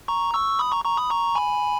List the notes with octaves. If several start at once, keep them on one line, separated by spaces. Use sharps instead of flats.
A#5 C#6
C#6 E6
B5 D#6
A#5 C#6
A#5 C#6
B5 D#6
A#5 C#6
G#5 B5